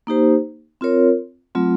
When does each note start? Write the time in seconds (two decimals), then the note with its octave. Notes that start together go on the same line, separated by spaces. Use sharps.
0.07 A#3 D#4 G4 C5
0.81 C4 F4 A#4 C#5
1.55 F#3 A3 C4 F4